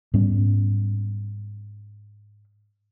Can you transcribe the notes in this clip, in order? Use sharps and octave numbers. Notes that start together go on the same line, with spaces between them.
G#2 G3 B3 C#4